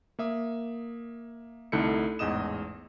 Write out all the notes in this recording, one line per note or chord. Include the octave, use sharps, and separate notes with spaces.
A#3 E5 D#6
C2 D3 A3 D#4 E4 C#7
A1 E2 G#2 D#5 D#6 E7